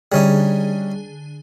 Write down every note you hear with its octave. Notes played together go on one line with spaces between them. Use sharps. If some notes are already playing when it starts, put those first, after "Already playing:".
D3 G3 C#4 D#4 G#4